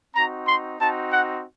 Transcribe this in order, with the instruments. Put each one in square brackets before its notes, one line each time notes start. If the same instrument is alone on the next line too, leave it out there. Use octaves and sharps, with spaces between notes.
[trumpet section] C4 D#4 F#4 A#5
C6
C4 D#4 F#4 A5
F#5